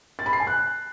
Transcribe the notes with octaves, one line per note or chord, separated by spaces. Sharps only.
A6
B5
C7
G#5
F#6